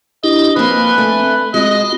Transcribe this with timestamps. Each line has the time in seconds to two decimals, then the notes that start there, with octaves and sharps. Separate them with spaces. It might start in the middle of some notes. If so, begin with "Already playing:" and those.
0.24 D4 E4 G4 D#5
0.56 F3 A#3 C4 B4 G#5
0.94 A3 D4
1.54 G#3 C4 F4 F#4 D#5